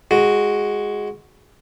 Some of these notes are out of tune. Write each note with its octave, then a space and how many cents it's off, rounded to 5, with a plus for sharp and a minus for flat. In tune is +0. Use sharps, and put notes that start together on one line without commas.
G#3 +0 F#4 +0